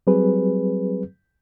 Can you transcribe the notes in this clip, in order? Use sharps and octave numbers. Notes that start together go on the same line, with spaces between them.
F#3 G3 C4 G#4 B4